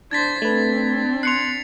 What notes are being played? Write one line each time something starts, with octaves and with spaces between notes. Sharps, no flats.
D4 C5 G#6 A6 B6
A3 C4 D4 B4
C6 F#6 C7 C#7 F7